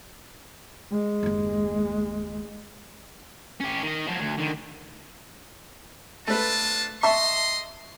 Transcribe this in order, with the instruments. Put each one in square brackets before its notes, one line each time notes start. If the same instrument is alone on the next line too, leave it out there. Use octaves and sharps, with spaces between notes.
[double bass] G#3
[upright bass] F#1 D#2
[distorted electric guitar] C#4 G4
D#3 D#5
F3 F#3
D2
D3 D#3
[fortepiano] A3 B4 [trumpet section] D4 F4 A5
[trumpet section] D#5 C6 [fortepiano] E5 A5 C#6